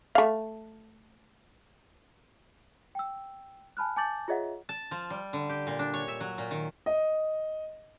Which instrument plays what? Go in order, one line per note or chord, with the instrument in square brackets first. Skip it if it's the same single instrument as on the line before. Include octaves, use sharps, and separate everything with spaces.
[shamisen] A3 F5
[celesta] G5 E6
G#5 A5 B5 F6 F#6
G#5 A5 D6 G6 A6 F#7
F4 G#4 C#5 D#5 E5 F#5
[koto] A5
F3
G3
D3
G4
A#2
D4
C#5
E5
F#3
A#2
D#3
[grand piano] D#5